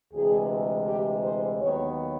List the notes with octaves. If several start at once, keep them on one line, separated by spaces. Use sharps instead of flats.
D2 C3 E3 G#3 G#4
G4
C5
D#2 D#3 F#3 B3 C#5